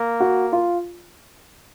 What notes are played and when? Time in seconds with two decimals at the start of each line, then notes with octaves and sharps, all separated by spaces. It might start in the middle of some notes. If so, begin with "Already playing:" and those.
Already playing: A#3
0.20 F#4
0.52 F4